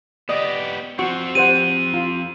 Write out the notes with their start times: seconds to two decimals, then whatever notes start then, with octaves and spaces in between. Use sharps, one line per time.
0.29 B3 G4 D5 D#5 D#6
0.99 F3 C4 F#4 F#5 C#6
1.35 G4 C5 F#5 D#7
1.94 F4